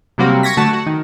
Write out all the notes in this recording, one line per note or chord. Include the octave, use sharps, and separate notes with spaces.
C3 F#3 G3 A#3 C4 F#4
C#6 G#6 A#6 B6
D3 A3 F#4 A5
F#4
D#3